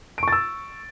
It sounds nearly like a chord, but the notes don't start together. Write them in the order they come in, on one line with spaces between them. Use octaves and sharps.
D7 C#6 A6 E6